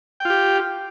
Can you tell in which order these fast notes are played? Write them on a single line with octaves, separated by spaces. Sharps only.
G5 F4 G4